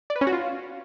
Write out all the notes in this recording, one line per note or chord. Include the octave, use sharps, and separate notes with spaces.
D5
B4
C#4
F#4
F4